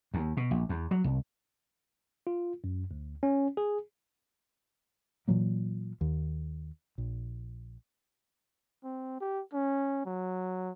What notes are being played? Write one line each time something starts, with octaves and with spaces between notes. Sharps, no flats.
D#2
B2
A#1
E2
F#3
C2
F4
F#2
D2
C#4
G#4
A#2 E3 F#3 A#3
D#2
A#1
C4
G4
C#4
F#3